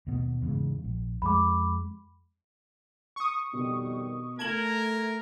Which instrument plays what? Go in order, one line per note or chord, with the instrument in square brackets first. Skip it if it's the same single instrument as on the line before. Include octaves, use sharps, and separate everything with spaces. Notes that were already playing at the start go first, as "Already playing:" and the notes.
[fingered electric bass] D#2 B2
E2 G#2 C#3
A#1
[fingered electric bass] F2 G#3 [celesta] B5 D6
[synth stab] C#6 D#6
[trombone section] F2 D#3 G3 [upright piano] B2
[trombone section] A3 [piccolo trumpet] A#4 [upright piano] A5 E7 F#7 [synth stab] G#6